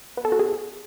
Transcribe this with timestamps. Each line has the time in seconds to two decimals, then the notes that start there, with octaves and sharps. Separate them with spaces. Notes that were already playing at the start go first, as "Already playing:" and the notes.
0.17 B3
0.25 A4
0.32 F#4
0.39 G#4